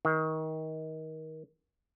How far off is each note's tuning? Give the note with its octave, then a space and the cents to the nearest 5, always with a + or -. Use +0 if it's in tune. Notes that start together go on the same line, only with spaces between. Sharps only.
D#3 +25